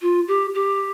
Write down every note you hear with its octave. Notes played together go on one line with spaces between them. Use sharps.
F4
G4
G4